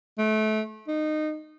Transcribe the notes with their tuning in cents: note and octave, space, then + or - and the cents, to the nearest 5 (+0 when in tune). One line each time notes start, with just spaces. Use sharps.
A3 -25
D#4 -20